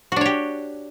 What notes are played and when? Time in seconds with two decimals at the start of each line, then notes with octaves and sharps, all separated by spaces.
0.12 F#4
0.16 D4
0.21 C#5
0.26 G4